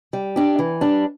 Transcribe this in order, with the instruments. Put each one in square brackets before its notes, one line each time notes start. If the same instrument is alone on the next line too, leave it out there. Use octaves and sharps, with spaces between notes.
[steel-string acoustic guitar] G3
D4 G4
E3
G3 D4